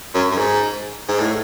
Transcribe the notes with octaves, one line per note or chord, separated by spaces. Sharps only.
F#2
F#2
G#2
G#2
A2